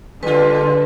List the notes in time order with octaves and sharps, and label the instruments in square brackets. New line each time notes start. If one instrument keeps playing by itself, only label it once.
[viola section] D3 [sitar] G3 F4 [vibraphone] B4